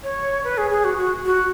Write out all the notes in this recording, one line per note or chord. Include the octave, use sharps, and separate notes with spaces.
C#5
B4
G#4
G#4
F#4
F#4
F#4